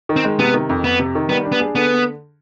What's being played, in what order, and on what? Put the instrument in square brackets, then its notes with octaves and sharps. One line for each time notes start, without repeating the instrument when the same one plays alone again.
[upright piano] D#3
[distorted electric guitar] C4
[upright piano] G#3
[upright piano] C3 [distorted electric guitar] B3
[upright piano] D#3
F2
[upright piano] F2 [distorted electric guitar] B3
[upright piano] C3
D#3
[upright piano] G3 [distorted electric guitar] B3
[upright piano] D4
[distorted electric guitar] B3
[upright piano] G#4
[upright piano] D3 [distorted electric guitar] B3